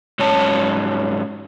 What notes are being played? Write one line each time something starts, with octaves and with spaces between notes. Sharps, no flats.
G#2 F#3 C#4 C#5 A5